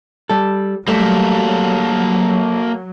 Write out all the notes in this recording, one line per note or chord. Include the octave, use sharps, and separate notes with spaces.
G3 A4
F#3 G3 A3 A#3 A4